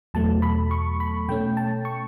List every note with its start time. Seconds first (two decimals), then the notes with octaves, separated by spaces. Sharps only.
0.14 E2 B2 F#3 A3 A5
0.42 B5
0.71 C#6
1.00 B5
1.28 B2 A3 C#4 G5
1.57 A5
1.85 C#6